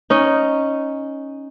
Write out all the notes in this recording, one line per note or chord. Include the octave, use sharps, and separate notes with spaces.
C#4 D#4